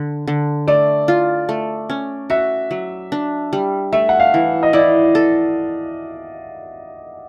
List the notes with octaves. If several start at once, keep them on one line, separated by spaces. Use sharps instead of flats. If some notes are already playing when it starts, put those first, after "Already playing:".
Already playing: D3
D3
A3 D5
F4
A3
C#4
F#4 E5
F#3
D4
G3
A3 E5
F#5
F5
E3
D#5
E4 D5
A4